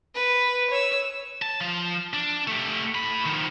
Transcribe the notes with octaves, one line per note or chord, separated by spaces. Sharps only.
B4
C#5 E6
A5
F3 F4
D4
A3 G4
A2 B5
D#3 F3